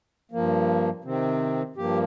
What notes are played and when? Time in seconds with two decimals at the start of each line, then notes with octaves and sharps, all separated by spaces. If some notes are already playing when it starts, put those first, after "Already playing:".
0.31 G2 F3 A#3
1.04 C3 D#3 C4
1.76 G2 F3 A#3 G4